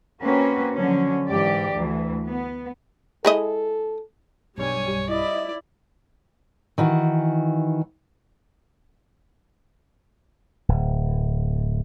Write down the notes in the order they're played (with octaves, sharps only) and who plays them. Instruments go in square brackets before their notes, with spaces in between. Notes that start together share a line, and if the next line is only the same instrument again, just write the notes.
[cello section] A#3 C4 C#4 F#4 B4
D3 F3 F#3 C#4
G#2 E3 G4 D5
D2 E3
B3
[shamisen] G#3 E4 D#5 [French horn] A4
[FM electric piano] B1 G2 [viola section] G3 G#5 [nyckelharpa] C#5
[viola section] E4 [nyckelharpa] D5 [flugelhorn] D#5
[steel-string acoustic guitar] D#3 E3 F#4
[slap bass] D1